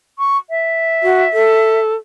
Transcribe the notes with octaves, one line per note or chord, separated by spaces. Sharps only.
C#6
E5
F#4
A4